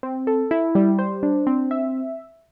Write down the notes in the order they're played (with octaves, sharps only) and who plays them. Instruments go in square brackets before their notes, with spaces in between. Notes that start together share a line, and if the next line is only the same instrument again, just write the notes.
[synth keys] C4
A4
E4
G3
C5
D4
C4
E5